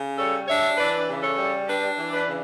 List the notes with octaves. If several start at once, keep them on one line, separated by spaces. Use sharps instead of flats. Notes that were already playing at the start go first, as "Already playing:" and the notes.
Already playing: C#3
G3 A4 C#5
D4 C#5 E5
E3 B4 D5
C#3
A4 C#5
G3
D4 G4 B4
E3
B4 D5
C#3